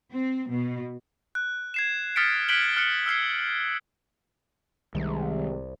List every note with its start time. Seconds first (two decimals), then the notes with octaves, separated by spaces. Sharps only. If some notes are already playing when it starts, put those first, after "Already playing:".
0.12 C4
0.49 B2
1.35 F#6
1.74 G#6 C7 E7
2.16 D#6 F6 A6 B6 C#7 D7
2.49 F#6 G#6 B6 D7 F#7 G7
2.77 F6 F#6 C#7
3.06 E6 F6 G#6 C7
4.95 C2 C3 D#3 G3 G#3